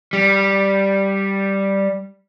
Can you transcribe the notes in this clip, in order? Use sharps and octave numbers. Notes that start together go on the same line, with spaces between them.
G3